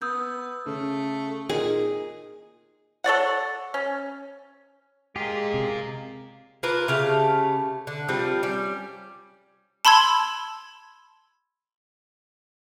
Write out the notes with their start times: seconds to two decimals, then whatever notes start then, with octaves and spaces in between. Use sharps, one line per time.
0.02 B3 D#6 E6 G6
0.66 C#3 A3
1.49 A#2 D#4 G#4
3.04 A4 C#5 D5 F#5
3.74 C#4
5.16 G#3 F4 G4 G#4 A#4
5.54 C3
6.63 A#3 F4 A#4 B4
6.88 C#3 A3 G4 F5
7.87 D3
8.09 F3 G3 C4
8.43 G3 C#4
9.85 A5 B5 C6 E6 G#6